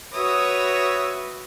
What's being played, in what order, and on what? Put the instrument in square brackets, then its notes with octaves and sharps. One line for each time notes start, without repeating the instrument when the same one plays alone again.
[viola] F#4 B4 [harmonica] C#5 E5 D#6